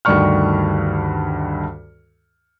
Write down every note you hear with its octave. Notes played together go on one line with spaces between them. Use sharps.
D2 G2 D#3 D5 C#6 F6